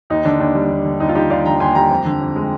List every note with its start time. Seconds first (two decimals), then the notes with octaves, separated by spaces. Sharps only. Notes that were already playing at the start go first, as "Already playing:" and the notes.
0.10 D#2 D#4
0.25 D3 D4
0.40 D#2 D4
0.55 G3
0.71 D#2
0.85 D3
1.00 D#2 D#4
1.09 F4
1.15 G3 D#4 G4
1.30 D#2 D5 F5
1.45 D3 G5 A#5
1.60 D#2 G#5 C6
1.75 G3 G5 A#5
1.90 F2
2.05 D3
2.21 F2
2.36 G#3